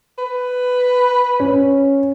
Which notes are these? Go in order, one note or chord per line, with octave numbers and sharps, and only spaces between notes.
B4
C#4